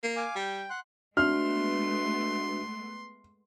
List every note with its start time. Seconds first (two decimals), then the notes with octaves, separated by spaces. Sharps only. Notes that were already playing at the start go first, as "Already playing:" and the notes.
0.03 A#3
0.16 F5 G#5 D6
0.35 G3 G5
0.70 F#5 C6 F#6
1.17 G#3 A3 B3 D4 F#4 E5 C6 F6